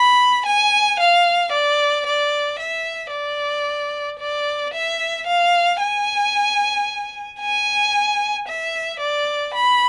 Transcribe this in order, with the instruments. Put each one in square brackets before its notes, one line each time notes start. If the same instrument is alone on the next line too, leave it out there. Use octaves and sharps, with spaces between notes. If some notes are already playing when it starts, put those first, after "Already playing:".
Already playing: [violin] B5
G#5
F5
D5
D5
E5
D5
D5
E5
F5
G#5
G#5
E5
D5
B5